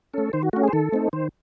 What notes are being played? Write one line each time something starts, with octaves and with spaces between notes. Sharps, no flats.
A3 C#4 A4
D#3 C5
F#4
A3 C#4 F#4
G#4
C5
D#3 A4
A3 C4 D#4
D#3 C5